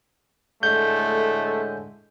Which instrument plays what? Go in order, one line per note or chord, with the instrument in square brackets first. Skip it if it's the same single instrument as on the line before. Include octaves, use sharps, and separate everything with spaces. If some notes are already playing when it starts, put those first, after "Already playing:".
[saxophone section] A2 D3 G#3 [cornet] A3 [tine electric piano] G6